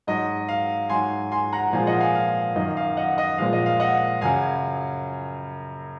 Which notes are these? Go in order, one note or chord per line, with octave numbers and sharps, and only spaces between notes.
G#2 F#3 D#5
F5
G#2 F#3 G#5 C6
G#5 C6
F#5 A#5
A#2 F3 G#3 F5 G#5
D#5 F#5
F5 G#5
F5
F#2 D#3 F#3 D#5
F5
D#5 F#5
D#5 F#5
A#2 F3 G#3 F5
D#5
F5
D#5 F#5
F#2 C#3 F#3 F5 G#5